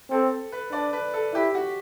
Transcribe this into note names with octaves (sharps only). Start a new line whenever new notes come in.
C4 A4
B4
D4 D5
B4
A4
E4 G4
F#4